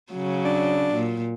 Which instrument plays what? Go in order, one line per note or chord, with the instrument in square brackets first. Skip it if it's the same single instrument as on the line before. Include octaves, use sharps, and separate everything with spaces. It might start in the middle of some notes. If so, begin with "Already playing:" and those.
[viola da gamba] C#3 F#3
[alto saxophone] D4
[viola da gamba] A#2